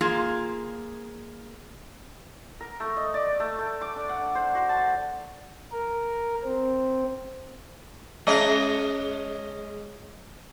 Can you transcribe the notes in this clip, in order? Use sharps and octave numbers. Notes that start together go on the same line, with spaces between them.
A#3 F4 G#4
A#4
A3
D#5
D5
A3
A3
D6
D4
F#5
C5
F#4
A5
A#4
C4
G#3 C#4 D#5